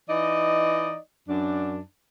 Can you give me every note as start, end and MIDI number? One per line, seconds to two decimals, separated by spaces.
0.10 0.97 52
0.10 0.97 63
0.10 0.97 74
0.10 0.97 75
1.28 1.81 42
1.28 1.81 62